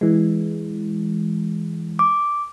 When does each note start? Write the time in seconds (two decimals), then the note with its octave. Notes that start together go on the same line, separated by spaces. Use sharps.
0.01 E3 G#3
1.99 D6